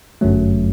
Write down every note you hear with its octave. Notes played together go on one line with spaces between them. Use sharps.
G1 F#2 F#3 A3